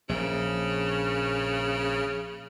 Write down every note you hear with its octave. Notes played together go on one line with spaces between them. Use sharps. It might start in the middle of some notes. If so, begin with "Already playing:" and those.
A#1 C#3